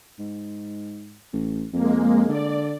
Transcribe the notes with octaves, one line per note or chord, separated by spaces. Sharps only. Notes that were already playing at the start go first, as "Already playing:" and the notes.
G#2
A1
F2 G#3 A#3
D3 D5